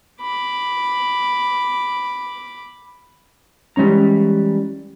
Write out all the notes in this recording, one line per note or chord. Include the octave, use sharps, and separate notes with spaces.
B5 D6
E3 G3 G#3 C#4 A#5